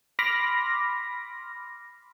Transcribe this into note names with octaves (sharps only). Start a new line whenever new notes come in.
B5 C6 D6 F6 A#6